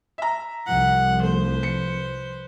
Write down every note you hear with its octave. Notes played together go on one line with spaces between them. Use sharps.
E5 A#5
C2 F3 F#5
A3 B4 C5
C#7